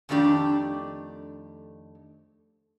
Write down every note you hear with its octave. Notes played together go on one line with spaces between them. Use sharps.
F2 D#3 A3 D4 G4